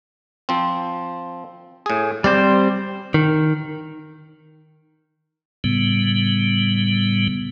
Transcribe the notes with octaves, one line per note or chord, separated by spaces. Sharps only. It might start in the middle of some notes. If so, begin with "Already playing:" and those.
F3 C4
A2 G#4
G3 C4 C5 D5
D#3
A2 C#3 G3 B3